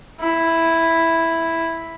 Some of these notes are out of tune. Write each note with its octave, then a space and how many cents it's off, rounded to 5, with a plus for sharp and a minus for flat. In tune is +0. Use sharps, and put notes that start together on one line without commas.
E4 +0